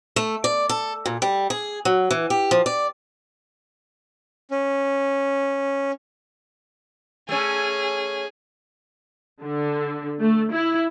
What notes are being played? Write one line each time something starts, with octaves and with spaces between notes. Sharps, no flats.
A3
D5
A4
A#2
G3
G#4
F#3
E3
G4
F3
D5
C#4
A3 C#4 G#4
D3
A3
E4